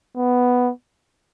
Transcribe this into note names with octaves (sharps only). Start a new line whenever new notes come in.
B3